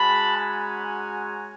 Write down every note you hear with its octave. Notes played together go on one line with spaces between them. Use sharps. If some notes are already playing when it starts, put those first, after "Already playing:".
Already playing: G#3 C#4 F#4 A5 B5
G#5 A#5